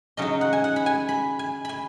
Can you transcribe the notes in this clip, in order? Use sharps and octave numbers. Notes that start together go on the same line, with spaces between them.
C#3 F#3 D#4 D#5
F#5
G#5
F#5
B5
G#5
B5
G#5
G#5 B5